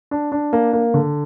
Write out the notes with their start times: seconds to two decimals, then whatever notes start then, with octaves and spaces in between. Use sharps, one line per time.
0.11 D4
0.32 D4
0.53 A#3
0.73 A#3
0.94 D3